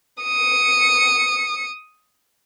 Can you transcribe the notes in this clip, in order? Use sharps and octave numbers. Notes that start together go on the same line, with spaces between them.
D#6 C#7